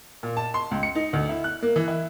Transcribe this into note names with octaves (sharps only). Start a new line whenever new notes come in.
A#2
A5
C6
C#2
C#7
D#4
D2
E4
F#6
A#3
E3
E4